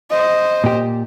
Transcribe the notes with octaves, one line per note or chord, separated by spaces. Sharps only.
C5 D#5
A#2 G4